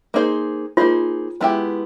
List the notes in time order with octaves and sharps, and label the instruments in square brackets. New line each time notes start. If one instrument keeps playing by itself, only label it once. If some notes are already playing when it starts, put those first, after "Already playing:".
[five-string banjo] A#3 D#4 G#4 C5
[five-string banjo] A#3 D#4 G#4 C5 [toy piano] F4
[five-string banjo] G#3 B3 E4 G4